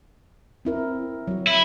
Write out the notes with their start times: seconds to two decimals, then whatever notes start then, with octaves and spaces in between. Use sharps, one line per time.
0.65 C4 E4 A#4
1.28 F#3 F#4
1.47 E4